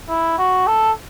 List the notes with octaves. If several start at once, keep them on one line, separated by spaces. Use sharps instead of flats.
E4
F#4
A4